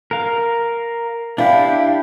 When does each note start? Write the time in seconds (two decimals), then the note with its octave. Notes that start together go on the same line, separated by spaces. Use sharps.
0.11 A#4 F5
1.38 D4 E4 G4 F5